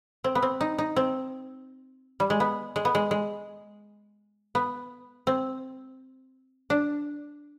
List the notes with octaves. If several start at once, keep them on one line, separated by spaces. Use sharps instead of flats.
C4
B3
C4
D#4
D#4
C4
G3
G#3
B3
G#3
B3
G#3
G#3
B3
C4
D4